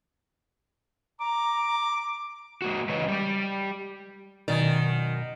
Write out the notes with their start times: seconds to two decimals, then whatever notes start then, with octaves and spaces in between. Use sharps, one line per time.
1.20 A#5 D6
2.62 G#3 A#3 F#4
2.89 C#3 E3 B4 C#5 D#5
3.08 G3 G4
4.48 F#2 B2 D#3 D5